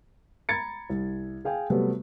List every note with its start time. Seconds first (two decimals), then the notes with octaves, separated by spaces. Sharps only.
0.49 A#5 B5 G#6 A6 C#7
0.90 C2
1.45 G#4 F5 G5 G#5
1.70 C3 F#3 G3 A3 B3